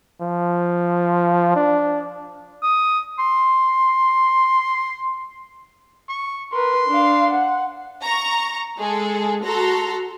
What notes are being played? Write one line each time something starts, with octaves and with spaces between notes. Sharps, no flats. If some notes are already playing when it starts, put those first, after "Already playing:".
F3
D4
D#6
C6
C#6
A#4 B4 C6
D4 F5
F#5
A#5 C#6
G#3 G#4 A4
F#4 A4 A#5 C6